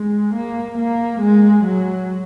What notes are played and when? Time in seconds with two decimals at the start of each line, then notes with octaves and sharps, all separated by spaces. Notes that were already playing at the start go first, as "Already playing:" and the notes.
Already playing: G#3
0.35 A#3
0.79 A#3
1.21 G#3
1.65 F#3